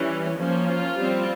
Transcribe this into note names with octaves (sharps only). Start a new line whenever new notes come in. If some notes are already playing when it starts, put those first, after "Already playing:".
Already playing: E3 G3 C#4
F3 A#3 C#4
F4
G3 C4